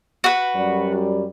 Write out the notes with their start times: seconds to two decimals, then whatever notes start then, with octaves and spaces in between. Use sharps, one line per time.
0.24 F#4 B4
0.55 F#2 G3